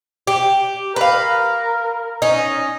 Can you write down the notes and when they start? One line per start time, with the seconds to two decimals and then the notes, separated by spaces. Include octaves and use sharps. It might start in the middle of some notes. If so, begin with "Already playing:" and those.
0.27 G4
0.96 A#4 B4 F5
2.22 C#4 D#4